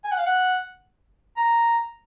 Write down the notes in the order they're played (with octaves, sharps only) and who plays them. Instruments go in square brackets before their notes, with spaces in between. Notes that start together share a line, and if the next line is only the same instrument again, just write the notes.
[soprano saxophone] G#5
F#5
F5
F#5
A#5